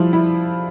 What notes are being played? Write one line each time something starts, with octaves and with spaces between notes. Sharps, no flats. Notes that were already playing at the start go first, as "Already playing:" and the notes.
Already playing: F3 G3 E4 F4
E4